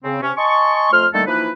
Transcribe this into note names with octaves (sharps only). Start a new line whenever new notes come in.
C#3 C4
C3 C#4
D#5 G#5 A5 C6 C#6
F2 F3 A3 C6 F6
D3 D#3 G3 A3 A#3 A4
E3 F3 A#3 D#4 E4 B4